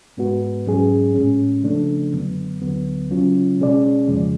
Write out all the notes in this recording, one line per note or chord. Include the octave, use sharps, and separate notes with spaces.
G#2 G#3 B3 F#4 B4
G#2 F#3 C#4 G#4
A2 G#3 C#4
C#3 F3 A3 D4
F#2 D3 F#3 B3
D2 D3 F#3 B3
C#3 F#3 C#4 F4
B2 G#3 C#4 G#4 D5
F2 C#3 F3 G#3